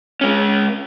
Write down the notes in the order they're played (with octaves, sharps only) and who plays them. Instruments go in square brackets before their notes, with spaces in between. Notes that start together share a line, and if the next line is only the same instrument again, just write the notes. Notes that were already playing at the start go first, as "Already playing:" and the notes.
[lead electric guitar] G#3 C#4